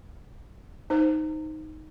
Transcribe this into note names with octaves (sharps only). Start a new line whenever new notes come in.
D#4 C5